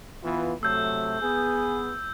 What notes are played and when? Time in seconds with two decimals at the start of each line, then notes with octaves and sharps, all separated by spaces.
0.23 E3 B3 F4
0.63 C3 F#3 A3 E6 G6
1.22 B3 G#4